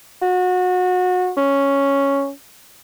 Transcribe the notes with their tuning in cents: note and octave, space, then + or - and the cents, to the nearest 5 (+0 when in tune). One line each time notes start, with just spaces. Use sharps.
F#4 -25
C#4 +0